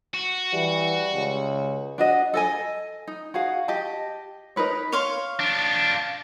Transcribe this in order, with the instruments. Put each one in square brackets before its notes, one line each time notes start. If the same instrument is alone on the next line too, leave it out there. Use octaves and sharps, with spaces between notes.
[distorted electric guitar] F#4
[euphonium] E3 [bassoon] G3
[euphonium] C#2
[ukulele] D4 F#4 D#5
A4 D#5 G#5
D#4
F#4 G#4 F5
G4 D#5 A5
D#4 A#4 B4 C#5
[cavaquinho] C#5 F5 C6
[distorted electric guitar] D4 F4